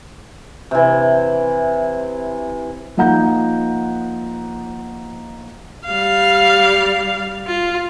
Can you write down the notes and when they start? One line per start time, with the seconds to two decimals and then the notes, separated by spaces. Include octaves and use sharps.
0.71 C3 E3
2.97 F3 A#3 D#4 F#5 A#5 G6
5.86 G3 F5
7.47 F4